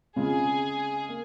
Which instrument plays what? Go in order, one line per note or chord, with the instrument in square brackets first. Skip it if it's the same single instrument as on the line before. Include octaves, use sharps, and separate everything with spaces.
[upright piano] C#3 G#3 C4 F4 [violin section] G#4
[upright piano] A#3